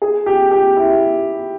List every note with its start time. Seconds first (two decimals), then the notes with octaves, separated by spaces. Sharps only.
0.02 G#4
0.26 G4
0.51 G4
0.77 E4